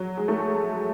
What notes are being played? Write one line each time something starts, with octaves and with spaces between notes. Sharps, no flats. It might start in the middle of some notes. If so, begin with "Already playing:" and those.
Already playing: F#3
G#3
A3